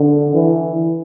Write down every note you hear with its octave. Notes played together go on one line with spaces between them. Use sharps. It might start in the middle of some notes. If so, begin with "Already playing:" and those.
Already playing: D3
E3